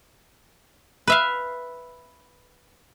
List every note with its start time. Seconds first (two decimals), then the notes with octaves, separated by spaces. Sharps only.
1.07 B4 E5 F5